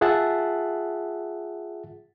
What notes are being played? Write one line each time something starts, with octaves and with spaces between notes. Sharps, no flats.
F4 G#4 E5 F#5 A5